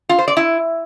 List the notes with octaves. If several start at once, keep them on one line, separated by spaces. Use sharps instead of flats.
F4
C5
D5
E4